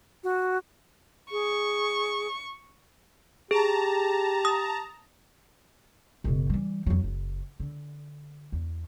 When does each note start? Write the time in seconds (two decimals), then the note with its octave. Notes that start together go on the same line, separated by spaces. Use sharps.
0.24 F#4
1.31 G#4 C#6
3.51 G4 G#4 A5 A#5
4.45 D#6
6.24 F#1 B2
6.50 E3 G3
6.86 F2 F#3
7.04 F#1
7.60 D3
8.52 E2